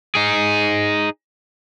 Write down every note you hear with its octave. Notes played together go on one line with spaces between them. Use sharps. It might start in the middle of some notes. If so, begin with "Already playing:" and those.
D#4 G#4